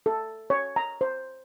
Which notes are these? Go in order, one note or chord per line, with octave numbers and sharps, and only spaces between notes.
A4
C#5
A#5
C5